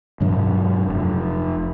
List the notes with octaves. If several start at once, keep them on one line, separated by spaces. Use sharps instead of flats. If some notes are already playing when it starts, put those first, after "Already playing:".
G2 B2 F#3 D4
F1